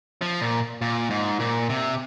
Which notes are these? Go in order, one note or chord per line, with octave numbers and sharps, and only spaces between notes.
F3
A#2
A#2
G#2
A#2
C3